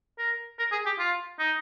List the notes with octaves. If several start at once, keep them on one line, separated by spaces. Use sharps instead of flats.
A#4
A#4
G#4
G4
F4
D#4